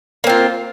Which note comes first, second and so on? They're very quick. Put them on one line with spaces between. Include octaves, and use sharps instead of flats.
A#3 C4 F4